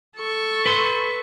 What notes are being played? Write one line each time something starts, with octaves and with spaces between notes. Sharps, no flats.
A4 C#6
B4 C6